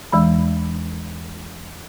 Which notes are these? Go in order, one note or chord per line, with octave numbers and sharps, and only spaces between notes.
E2 E3 G#3 B5